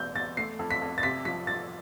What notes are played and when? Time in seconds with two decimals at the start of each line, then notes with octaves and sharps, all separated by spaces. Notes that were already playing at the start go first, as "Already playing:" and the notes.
Already playing: E2 B2 A3 G6
0.15 E2 A6
0.37 A3 C7
0.59 F2
0.71 B6
0.81 F2
0.98 A6
1.03 C3 B6
1.25 F3 B6
1.47 F3 A6